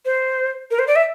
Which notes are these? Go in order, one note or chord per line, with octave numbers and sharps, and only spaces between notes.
C5
A#4
C5
D5
E5